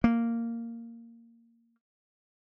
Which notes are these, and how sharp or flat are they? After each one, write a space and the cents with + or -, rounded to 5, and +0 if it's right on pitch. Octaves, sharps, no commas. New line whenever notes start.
A#3 -10